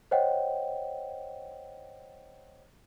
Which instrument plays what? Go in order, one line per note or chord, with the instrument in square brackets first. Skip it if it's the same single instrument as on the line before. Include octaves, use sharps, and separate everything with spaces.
[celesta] C5 C#5 D#5 F#5 G5